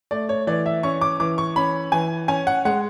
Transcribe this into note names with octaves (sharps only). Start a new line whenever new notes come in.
A3 D5
C#5
E3 D5
E5
C#4 C#6
D6
E3 D6
C#6
C#4 B5
E3 G#5
C#4 G#5
F#5
G#3 F#5